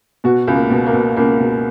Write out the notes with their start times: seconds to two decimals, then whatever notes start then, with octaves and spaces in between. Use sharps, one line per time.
0.24 B2 F#4
0.47 C#2
0.55 A#3
0.70 B2
0.86 A#3
0.93 B2
1.17 C#2 A#3
1.40 B2